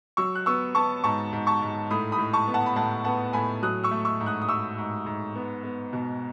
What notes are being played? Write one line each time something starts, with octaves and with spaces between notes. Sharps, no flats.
F#3 C#6 E6
F#6
B3 C#6 E6
B3 A5 C#6
G#2 A5 C#6
G#2
A5 C#6
G#2
A2 B5 D#6
B5 D#6
A2
A5 C#6
B3
F#5 A5
B5
A2 F#5 A5
B3 F#5 A5
A2 G#5 B5
F#3 D#6 F#6
C#6 E6
A3
C#6 E6
G#2
D#6 F#6
D#6
A3 C#6 E6
G#2
G#2
B3
B3
B2